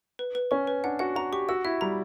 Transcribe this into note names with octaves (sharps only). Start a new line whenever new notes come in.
B4
B4
C#4 C#6
B4
D4 F#5
F#4 F#5
F#4 A#5
G4 C#6
F#4 E6
E4 E5
G3 A#5